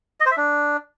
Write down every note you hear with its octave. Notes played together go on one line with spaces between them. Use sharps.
D#5
C5
E5
D4